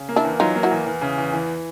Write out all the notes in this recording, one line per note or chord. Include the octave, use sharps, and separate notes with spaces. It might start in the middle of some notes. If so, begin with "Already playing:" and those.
Already playing: C#3
A#3
D4 E4
E2
F#3 D#4 F4
A#3
E4 F#4
E2
E2
C#3
E2
E3